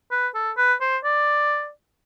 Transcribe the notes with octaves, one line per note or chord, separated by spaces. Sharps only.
B4
A4
B4
C5
D5